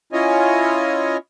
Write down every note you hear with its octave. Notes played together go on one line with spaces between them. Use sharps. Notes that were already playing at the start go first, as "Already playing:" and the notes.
C#4 E4 F4 C#5 D#5 G#5